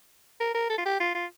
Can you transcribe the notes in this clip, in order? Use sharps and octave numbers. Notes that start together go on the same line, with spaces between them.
A#4
A#4
A4
F4
G4
F4
F4